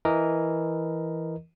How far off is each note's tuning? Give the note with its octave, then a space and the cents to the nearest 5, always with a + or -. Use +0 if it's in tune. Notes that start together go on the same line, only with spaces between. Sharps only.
E3 +0 A#4 +0 D#5 +0